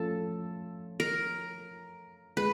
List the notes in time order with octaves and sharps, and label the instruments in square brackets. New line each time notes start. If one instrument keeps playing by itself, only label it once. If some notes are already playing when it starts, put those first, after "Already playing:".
Already playing: [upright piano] F3 A3 C#4 [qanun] A4
[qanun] A#4
[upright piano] G#3 [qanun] B4